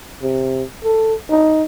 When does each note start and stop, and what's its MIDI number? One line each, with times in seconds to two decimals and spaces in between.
0.22 0.63 48
0.84 1.14 69
1.30 1.64 63